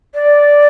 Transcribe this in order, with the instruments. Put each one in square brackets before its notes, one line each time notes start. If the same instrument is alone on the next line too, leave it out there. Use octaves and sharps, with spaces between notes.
[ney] D5